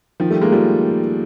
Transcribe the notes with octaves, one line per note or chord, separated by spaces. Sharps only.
D#3 F3
G3 A3
G#3 A#3
F3 G3